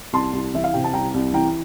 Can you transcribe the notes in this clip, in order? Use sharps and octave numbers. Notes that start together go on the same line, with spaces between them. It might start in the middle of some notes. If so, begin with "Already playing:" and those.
C2 A5 C6
C2
E3 E5
F5
C3 G5
A5
C2 G5 A#5
C2
E3 G5 A#5